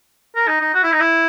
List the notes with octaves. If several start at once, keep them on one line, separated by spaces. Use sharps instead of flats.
A#4
D#4
D#4
F#4
E4
D#4
E4